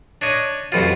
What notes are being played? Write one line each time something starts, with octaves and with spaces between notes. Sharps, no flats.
D4 C#5 D#5
A1 F2 B2 F4